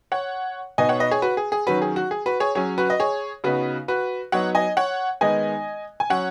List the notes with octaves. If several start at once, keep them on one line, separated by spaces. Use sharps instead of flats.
C#5 F#5
B2 B3 D#4 D#5 G#5
C#5 F#5
B4 D#5
G#4 C#5
F#4 B4
G#4
G#4
D#3 F#3 C#4 F#4 B4
G#4
F#4
G#4
F#4 B4
G#4 C#5
F#3 C#4 G#4 C#5
F#4 B4
D#5
G#4 C#5
C#3 B3 D#4 F#4 B4
F#4 B4
F#3 B3 D#4 C#5 F#5
D#5 G#5
C#5 F#5
D#3 G#3 B3 D#4 D#5 G#5
G#5
F#3 C#4 C#5 F#5